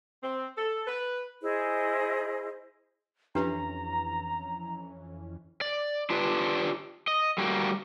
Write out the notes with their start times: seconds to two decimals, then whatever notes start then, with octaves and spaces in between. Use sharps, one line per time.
0.23 C4
0.56 A4
0.87 B4
1.42 E4 G#4 C5 D#5
3.35 F2 E3 C#4 D4 G4 B4 A#5
5.61 D5
6.10 D4 F4 G4 B4 D5
7.08 D#5
7.38 G3 A3 A#3 F#4 D5